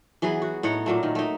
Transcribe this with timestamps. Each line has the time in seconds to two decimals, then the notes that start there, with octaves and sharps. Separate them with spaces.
0.22 E3 F#3 B3 G#4
0.42 F#4
0.63 A2 D#4 C#5 F#5
0.86 A#2 F#3 A3
1.03 D#3
1.15 A3 D#4